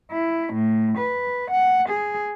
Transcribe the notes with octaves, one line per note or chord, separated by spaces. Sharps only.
E4
A2
B4
F#5
G#4